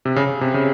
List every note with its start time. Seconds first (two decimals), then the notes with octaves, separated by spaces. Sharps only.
0.05 C3
0.16 C#3
0.41 C3
0.54 C#3